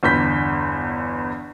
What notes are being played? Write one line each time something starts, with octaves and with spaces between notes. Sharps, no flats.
G1 E2 G6 B6